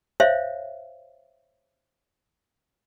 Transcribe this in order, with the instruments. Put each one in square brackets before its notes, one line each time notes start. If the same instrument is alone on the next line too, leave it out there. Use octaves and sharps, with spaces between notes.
[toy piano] C5 C#5 E5 F5